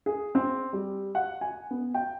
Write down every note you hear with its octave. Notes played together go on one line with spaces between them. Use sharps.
G#4
C4
G3
F#5
G#5
B3
G5